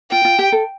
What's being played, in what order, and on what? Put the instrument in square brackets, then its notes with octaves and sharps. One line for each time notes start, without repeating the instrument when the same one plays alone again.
[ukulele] F4 [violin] G5
[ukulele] F4
G4
A4